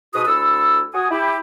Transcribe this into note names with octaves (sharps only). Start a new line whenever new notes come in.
G#2 B2 F#4 B4 D#6
D2 E4 A4 E6
F#4 G#5 D#6
E4 G4